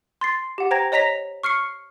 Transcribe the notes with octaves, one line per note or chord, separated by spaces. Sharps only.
C6 A6 C7
G4 F#5
C5 G5 A#5 G#6 A#6
C#5 D#5 A#5 A#6 B6 F7
C#6 F6 C7 C#7